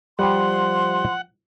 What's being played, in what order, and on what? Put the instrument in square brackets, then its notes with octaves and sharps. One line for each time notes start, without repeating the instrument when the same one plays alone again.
[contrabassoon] F3 [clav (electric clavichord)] G3 G5 [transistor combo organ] F#5 [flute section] C6